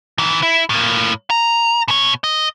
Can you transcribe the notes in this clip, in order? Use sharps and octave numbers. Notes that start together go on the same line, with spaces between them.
D#3 E3
E4
A2 A#3
A#5
B2 C#5
D#5